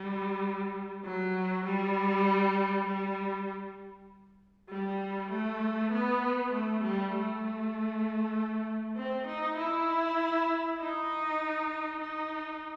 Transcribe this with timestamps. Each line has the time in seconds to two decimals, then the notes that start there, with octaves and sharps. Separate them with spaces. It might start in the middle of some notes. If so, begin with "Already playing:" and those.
Already playing: G3
1.04 F#3
1.65 G3
2.86 G3
4.70 G3
5.31 A3
5.92 B3
6.53 A3
6.83 G3
7.13 A3
8.96 C4
9.27 D#4
9.57 E4
10.80 D#4
12.01 D#4